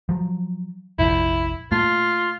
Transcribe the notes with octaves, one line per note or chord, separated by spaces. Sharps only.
F3 F#3
F1 A#1 F3 E4
A#2 A3 F4